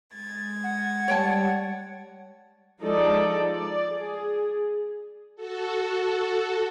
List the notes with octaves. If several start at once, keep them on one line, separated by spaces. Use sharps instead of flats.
G#3 G#6 A6
F#5
G3 C#5 G5 A5
F3 G#3 D#4 A4 D5
D5
G#4
F#4 A4